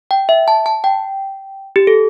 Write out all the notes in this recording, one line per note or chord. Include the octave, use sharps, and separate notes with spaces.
G5
E5
A5
A5
G5
G4
A4